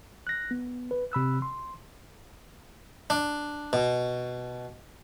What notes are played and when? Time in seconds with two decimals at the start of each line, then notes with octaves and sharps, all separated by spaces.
0.27 F#6 A#6
0.51 B3
0.91 B4
1.12 C3 B5 E6 F#6
1.42 C6
3.10 D4
3.73 B2